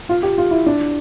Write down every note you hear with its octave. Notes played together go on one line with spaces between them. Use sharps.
F4
G4
F4
E4
D4